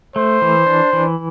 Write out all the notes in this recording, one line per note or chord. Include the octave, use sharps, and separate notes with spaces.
A3 C5
E3
D4
E3